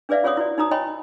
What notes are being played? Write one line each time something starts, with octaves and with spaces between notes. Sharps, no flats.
D4 G#4 B4 D5 E5 F5
F4 G#4 C#5 F#5 C6 D#6
E4 F#4 D5
D#4 F#4 A#5 D#6
C#5 D#5 G5 G#5 B5 C6